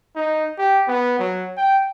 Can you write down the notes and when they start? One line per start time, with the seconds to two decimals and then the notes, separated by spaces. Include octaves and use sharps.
0.16 D#4
0.58 G4
0.88 B3
1.19 F#3
1.57 G5